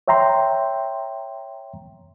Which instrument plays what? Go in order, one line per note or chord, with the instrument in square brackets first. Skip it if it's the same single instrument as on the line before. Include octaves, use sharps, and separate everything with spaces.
[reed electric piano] C#5 E5 G5 A#5 C6